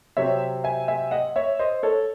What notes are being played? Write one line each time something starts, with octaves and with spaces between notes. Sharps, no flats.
C3 F#3 C4 C#5 E5
E5 G#5
E5 G#5
D#5 F#5
C#5 E5
C5 D#5
A4 C#5